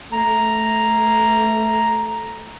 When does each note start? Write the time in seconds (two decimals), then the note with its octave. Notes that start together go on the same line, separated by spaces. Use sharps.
0.12 A3 A#5